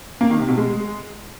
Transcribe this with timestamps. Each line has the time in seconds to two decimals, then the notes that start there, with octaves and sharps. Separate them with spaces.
0.21 A#3
0.30 D#3
0.39 C3
0.48 B2
0.58 G#3